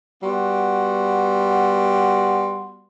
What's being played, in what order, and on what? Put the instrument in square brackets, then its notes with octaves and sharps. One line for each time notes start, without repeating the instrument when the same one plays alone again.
[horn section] G3 B3 F#4 F#5 C6